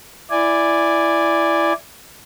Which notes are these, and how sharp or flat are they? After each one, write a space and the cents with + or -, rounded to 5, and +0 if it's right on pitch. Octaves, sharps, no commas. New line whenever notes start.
E4 +15 D5 +0 G#5 -10